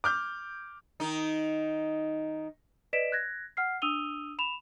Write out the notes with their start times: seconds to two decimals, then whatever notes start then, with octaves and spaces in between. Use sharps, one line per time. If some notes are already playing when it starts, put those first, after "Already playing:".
0.04 D6 F6 G6
1.00 D#3 D#4
2.93 B4 D5 D#5 B6 D7 E7
3.12 F#6 G#6 A#6
3.57 F#5 F6 C7
3.82 D4 D#6 E6 D#7 F7 G7
4.39 B5 E7 F7